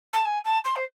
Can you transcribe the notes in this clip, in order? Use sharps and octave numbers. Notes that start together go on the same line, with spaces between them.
A5
G#5
A5
C6
C5